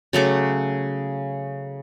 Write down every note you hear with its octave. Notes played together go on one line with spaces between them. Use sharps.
C#3 F#3 A3 D6